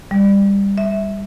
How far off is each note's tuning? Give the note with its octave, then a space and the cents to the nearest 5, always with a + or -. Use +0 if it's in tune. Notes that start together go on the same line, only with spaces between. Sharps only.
G3 +20
E5 -15